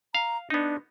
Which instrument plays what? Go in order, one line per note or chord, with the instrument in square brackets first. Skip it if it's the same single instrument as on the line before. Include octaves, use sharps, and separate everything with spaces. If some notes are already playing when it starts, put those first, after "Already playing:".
[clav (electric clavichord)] F5 [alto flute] A#5
[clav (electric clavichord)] B3 D#4 [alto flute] D4